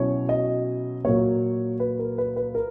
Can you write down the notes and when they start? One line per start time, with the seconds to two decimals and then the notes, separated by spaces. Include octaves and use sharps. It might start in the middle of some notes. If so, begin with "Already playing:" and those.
Already playing: B2 F#3 C#4 E4 C#5
0.29 D#5
1.04 A#2 F#3 A#3 C#5
1.80 B4
1.99 A#4
2.18 B4
2.36 B4
2.55 A#4